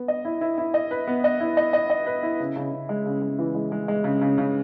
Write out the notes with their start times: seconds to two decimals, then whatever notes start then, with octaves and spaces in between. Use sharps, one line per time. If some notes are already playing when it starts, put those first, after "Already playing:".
Already playing: B3
0.08 D#5
0.25 E4
0.41 E4
0.58 E4
0.74 D#5
0.91 B4
1.07 B3
1.24 D#5
1.40 E4
1.57 D#5
1.73 D#5
1.90 D#5
2.06 B4
2.23 E4
2.40 C#3
2.56 C#3
2.72 C#3
2.89 G#3
3.06 C#3
3.22 G#3
3.39 E3
3.55 G#3
3.72 G#3
3.88 G#3
4.04 C#3
4.22 C#3
4.38 C#3